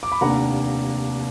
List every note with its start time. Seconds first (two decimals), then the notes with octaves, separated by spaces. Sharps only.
0.03 D6
0.12 B5
0.21 F1 D#2 D#3 A#3 D4 F#5 A#5